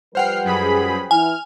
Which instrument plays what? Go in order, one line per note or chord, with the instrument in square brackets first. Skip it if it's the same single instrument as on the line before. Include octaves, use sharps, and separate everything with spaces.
[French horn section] F3 G3 B4 [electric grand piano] C5 F#5 G5 [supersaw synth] F6 C7
[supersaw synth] F#2 G#4 B5
[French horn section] E3 E4 [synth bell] G#5 [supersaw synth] F6